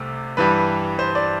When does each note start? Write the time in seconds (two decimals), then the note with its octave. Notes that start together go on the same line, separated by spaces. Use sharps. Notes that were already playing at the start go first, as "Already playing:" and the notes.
Already playing: C2 C3 A3
0.37 G2 E3 G3 B4
0.99 C5
1.15 D5